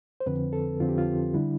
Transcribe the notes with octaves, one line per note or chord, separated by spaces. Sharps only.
C5
F2 D3 F3 C4 B4
A4
F2 D3 F3 C4 F4
G4
F4
D3 G3 D4 E4